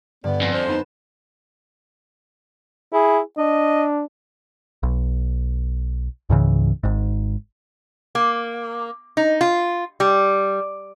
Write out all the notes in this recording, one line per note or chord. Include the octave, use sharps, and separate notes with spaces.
G2 D3 B3 D5
F2 G#5
C5
B3 D#4 A6 E7
E4 G#4
D4 D#5
B1
C#2 G#2 C#3 E3
G#1 G#2
A#3
D#4
F4
G3